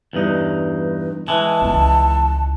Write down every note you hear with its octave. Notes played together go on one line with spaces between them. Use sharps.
E2 G2 D#4
E3 G#3 A5
C#2 D#3